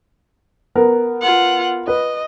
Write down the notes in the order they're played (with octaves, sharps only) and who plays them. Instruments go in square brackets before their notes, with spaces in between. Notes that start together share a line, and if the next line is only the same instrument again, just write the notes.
[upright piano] B3 A#4
[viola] F4 F#5
[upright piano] B4 [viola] D#5